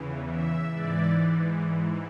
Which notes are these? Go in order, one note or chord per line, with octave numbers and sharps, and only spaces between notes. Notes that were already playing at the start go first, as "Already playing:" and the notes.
Already playing: E2 C#3 E3
E5
G#2 E3 D5